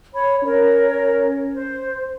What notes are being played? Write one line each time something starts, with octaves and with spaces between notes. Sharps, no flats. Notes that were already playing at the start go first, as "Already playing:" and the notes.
C#5 B5
C#4 A#4 C#5
C5